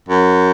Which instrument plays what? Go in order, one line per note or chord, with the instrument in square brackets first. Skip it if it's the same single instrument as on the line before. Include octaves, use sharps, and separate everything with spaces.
[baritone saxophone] F#2